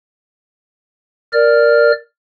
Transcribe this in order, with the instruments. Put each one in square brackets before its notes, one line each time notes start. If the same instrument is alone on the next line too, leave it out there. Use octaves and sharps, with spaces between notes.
[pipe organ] A#4 D5 F6